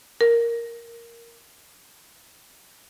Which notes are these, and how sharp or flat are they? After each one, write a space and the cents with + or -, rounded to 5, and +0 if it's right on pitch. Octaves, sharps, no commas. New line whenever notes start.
A#4 +0